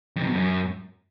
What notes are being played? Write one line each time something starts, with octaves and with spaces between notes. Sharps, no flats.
F2
C3
B2
F#2